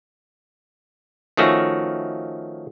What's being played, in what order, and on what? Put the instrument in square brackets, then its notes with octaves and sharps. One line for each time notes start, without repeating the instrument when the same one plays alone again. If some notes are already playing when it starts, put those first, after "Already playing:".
[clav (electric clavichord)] D#3 F3 A3 C#4 F#4